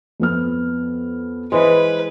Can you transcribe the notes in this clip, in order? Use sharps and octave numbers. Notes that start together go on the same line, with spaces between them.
F2 B3 F6
E3 G#3 B4 C5 D#5